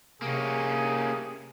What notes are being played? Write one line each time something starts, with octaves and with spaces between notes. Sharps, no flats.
C3 A#3 C#4 G#4